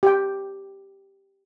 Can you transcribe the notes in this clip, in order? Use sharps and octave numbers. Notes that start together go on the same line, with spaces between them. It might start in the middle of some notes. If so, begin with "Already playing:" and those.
G4 G5